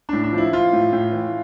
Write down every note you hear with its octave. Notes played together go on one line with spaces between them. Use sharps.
A2 D4
D4
F3
E4
F3 F4
A2
A2
E3